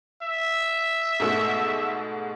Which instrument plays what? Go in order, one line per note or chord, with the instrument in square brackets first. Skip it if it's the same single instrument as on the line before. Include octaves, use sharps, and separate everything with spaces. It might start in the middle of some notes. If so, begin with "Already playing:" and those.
[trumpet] E5
[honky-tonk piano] G#2 B2 A3